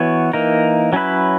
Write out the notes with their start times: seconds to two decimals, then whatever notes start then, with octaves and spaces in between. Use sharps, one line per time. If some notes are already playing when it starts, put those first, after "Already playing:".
Already playing: E3 B3 F#4 C#5
0.33 E3 A#3 D#4 A#4
0.93 F#3 C#4 E4 B4